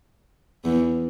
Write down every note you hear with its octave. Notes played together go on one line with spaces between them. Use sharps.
E2